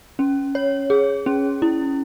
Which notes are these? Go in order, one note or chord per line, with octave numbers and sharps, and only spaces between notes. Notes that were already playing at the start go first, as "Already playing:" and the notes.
C#4
C#5
G#4
C#4
E4